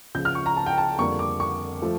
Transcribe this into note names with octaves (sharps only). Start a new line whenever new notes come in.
C#2 C#3 F3 G6
F6
C#6
A#5
A5
G5
A5
F2 D3 G3 A#3 C#6
D6
C#6
F3 A3